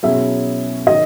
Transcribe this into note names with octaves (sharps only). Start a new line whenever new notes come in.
B2 F#3 C#4 E4 G#4 E5
D#3 F#3 D#5